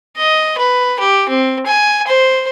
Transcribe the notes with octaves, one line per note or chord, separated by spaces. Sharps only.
D#5
B4
G4
C4
G#5
C5